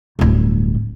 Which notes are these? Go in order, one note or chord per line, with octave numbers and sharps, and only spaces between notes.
D1 G1